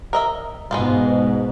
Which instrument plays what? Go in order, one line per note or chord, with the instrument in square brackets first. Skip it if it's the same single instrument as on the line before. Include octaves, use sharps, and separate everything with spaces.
[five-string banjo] A#4 D#5 E5
[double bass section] G#2 B2 [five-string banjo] G#3 B3 F4